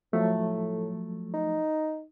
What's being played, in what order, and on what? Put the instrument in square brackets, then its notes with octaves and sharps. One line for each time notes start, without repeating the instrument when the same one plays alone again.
[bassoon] A2 [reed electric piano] F3 F#3 A3
[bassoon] D#4